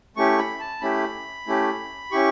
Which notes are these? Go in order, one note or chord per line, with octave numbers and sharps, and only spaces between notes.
A3 C#4 E4 G4 C#6
B5
A5
A3 C#4 E4 G4 B5
A3 C#4 E4 G4
C#4 E4 G4 C#6